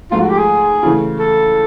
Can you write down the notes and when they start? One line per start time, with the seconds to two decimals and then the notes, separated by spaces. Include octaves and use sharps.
0.11 G#2 F3 A3 F4
0.21 F#4
0.29 G4
0.38 G#4
0.83 C#3 E3 A3
1.19 A4